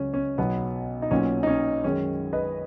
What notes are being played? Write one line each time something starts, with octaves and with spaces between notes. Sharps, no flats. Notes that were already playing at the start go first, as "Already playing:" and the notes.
Already playing: C#2 C#3 F#3 C#4
C#4
B1 B2 F#3 B3
D#4
B1 A#2 F#3 C#4
D#4
C#4
F#2 D#3 G#3 C#4
B4 D#5